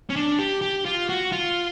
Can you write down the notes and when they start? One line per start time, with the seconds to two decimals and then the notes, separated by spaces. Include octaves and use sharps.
0.10 C#4
0.16 D4
0.39 G4
0.62 G4
0.85 F4
1.09 F#4
1.32 F4